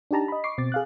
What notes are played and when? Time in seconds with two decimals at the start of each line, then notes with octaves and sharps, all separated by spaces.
0.11 D4 D#4 G4 A5 A#5
0.28 D#5 B5
0.44 C#6 D6 C7
0.58 B2 C4 D6 A6
0.72 G#4 F5 F#6